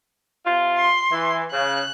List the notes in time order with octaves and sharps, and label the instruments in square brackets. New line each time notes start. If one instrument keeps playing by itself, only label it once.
[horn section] C3 F4
[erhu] C6
[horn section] E3
[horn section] C#3 [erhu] F#6